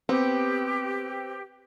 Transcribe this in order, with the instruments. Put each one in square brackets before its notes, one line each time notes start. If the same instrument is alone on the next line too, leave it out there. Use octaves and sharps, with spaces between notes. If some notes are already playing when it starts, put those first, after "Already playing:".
[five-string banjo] B3 [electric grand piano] C4 [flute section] G4